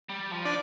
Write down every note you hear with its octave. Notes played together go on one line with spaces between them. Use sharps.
G3
F3
D4